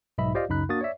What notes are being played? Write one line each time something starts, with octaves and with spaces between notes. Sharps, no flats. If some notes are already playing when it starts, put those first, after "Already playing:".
B1 G#2 D#5 E5 B5
F4 G4 C5 D5 D#5 F5
C#2 F#2 C#3 D#4 B5 F#6
A#3 D4 F#4 D#6 A6
C#5 D5 E5